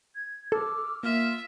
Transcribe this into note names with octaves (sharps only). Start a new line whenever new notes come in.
G#6
A4 D6 E6 F6
A#3 F4 E5 F6